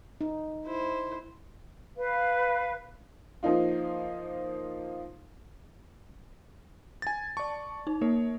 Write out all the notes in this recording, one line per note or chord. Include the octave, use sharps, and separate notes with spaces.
D#4
E4 C5
B4 F5
F3 A#3 D#4 F4
G#5 A6
D5 A5 C#6
D#4
A#3 A#4 C#5